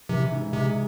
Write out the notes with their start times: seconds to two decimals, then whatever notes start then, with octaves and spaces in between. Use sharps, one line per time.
0.09 C3 E3
0.32 G#2
0.53 C3 G#3